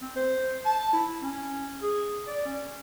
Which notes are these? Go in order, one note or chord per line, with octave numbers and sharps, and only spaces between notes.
C4
C5
A5
E4
C#4
G#4
D5
C#4